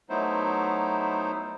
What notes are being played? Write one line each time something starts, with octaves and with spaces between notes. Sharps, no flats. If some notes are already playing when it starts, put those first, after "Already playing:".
F#3 A3 B3 D#4 E4 C5